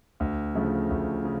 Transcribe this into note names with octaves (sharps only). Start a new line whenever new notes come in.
D2
C#3 F3 A3
D2
C#3